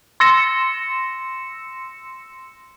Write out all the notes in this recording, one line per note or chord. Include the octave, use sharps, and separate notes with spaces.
C6 E6 A#6 C#7 E7